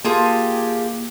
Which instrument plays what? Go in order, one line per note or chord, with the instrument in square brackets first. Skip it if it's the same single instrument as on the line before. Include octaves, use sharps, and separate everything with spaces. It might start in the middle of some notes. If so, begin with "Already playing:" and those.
[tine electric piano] A#3 [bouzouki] F4 G#4 A5 [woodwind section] G4